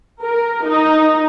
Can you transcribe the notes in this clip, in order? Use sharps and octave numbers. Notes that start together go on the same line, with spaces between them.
A#4
D#4